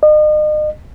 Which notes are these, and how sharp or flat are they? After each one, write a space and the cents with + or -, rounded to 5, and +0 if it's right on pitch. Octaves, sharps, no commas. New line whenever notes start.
D#5 -40